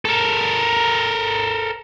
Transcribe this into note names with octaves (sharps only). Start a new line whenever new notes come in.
A4 A#4